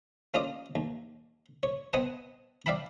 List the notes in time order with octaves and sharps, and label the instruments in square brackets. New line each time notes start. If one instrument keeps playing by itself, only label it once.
[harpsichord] A#3 C#4 F4 D5 D#5
D#2
C#5
B3 C4 D#5 F#5 G#5 A5
D5 E5 F5 G5 A5 B5